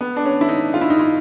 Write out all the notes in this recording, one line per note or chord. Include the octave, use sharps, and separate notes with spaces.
B3
D4
C#4
E4
D#4
F4
E4
D#4
E4